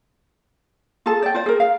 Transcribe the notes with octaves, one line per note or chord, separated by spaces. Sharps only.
F4 G#4 A4 A5
D5 G5
F4 C5 D5
G#4 A#4
F5